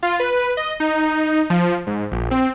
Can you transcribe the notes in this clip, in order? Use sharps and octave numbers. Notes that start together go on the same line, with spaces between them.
F4
B4
D#5
D#4
F3
G#2
A#1
C4